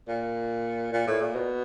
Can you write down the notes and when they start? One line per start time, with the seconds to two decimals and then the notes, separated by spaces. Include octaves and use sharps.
0.08 A#2
0.93 A#2
1.07 A2
1.21 A#2
1.35 B2